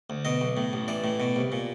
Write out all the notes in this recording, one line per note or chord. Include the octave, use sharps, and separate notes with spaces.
D2
B2 D#5
B1
A2
A1
E3 D5
A2
B2
C2
A#2